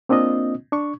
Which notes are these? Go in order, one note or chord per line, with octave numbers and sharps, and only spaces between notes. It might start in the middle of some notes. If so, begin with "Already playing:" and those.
A#3 C4 D4 F4 D#5
D4 C#6